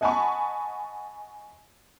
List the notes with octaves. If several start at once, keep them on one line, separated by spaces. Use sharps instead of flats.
D#5 F#5 G#5 A5 B5 C#6